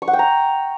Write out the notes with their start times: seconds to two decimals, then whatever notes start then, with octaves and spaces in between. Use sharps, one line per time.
0.02 C#6
0.08 F#5
0.13 G5
0.19 A#5